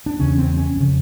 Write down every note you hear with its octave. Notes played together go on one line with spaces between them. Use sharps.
D4
E2 C#3 C#4
C4
C#4
F2 C#3